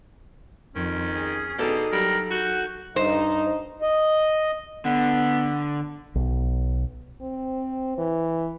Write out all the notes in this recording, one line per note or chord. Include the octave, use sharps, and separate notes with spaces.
F2 D#3 C#4
G#4
B2 D#4 G#4 A4 D5
F#3 G3 A#4
F#4 F#5 G6
G2 D#4 C5
D#5
D3 B3
B1
C4
E3